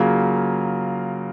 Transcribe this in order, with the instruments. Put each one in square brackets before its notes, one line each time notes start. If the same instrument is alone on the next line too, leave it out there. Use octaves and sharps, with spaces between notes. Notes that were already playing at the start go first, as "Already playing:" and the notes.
Already playing: [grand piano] C#3 F#3 A#3 F4